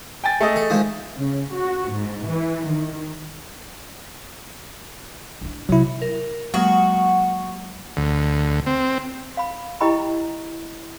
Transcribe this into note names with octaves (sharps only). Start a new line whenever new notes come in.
G5 G#5 A6
A3 G#4 D#5
A4
D#3 F3 G#3
C#3
F#4
G#2
E3
D#3
D4 E4
C3 F#3 E4
A#4
F#3 G#3 A#3 F#4
D2
C4
F5 B5
E4 G4 D#5 G5 A#5 B5